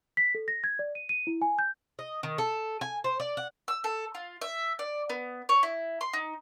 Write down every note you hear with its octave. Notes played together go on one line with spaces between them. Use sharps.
B6
A4
A#6
G#6
D5
D#7
D#7
E4
G#5
G6
D#5
D#3
A4
G#5
C5
D5
F#5
E6
A4
F4
E5
D5
B3
C#5
E4
C6
D#4